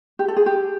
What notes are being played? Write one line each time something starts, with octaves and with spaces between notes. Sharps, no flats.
G4
A4
G#4
G4